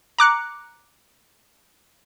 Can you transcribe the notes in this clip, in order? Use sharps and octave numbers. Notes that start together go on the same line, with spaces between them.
A#5 D6 F#6 C#7